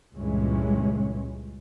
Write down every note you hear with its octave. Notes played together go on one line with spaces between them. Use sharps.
C#2 G2 A#2 E3 G#3 C#4